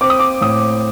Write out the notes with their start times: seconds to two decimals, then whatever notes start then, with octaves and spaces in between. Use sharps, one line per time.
0.01 C4 D6
0.10 D#6
0.19 D6
0.41 A2 D#6